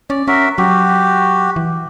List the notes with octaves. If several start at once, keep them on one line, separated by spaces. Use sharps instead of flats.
C#4 D5
C#4 F#4 A#4 E5
F#3 F#4 G4
E3